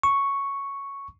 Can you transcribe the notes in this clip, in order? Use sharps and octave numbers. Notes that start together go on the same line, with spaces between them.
C#6